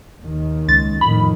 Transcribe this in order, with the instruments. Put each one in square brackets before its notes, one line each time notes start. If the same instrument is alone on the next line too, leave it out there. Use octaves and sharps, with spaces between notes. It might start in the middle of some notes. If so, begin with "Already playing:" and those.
[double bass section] D#2 D#3
[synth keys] C#2 A6
[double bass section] F2 A2 D#3 [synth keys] B5